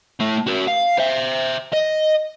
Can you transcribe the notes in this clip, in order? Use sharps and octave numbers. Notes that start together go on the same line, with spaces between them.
A3 E4
F#4 A#4
F5
C5 E5
D#5